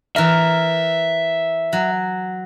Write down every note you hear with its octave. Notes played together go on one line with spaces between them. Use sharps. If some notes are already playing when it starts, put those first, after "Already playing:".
E3 A#4 E5
F#3